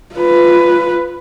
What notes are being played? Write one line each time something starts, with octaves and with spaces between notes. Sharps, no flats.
F4 B4